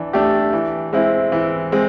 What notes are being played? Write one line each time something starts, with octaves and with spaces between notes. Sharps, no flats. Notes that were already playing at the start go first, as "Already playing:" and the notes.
Already playing: E3 D4
A3 D4 G4
E3
G#3 C4 E4
E3
G#3 C4